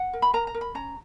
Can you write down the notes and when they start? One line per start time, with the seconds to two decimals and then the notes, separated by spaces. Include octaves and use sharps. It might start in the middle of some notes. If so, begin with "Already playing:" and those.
Already playing: F#5
0.13 A#4
0.22 B5
0.34 A#4 A#5
0.47 A#5
0.54 A#4
0.61 B5
0.75 C#4 A#5